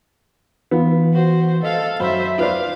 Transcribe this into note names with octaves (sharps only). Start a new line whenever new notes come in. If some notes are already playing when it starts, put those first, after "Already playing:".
E3 B3 F4
F#4 C5
A4 D#5 F5
F#2 C5 E5 B5
F4 B4 C5 D5 F5